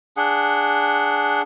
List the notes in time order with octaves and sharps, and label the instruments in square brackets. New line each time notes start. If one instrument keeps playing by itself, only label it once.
[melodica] D4 G#4 F#5